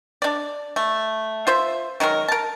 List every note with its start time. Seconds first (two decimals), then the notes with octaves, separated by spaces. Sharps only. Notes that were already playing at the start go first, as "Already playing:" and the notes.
0.22 D4 D5
0.76 A3
1.47 F4 C5 E5
2.00 D#3 F#3 G#3 A#4
2.28 A#4 A5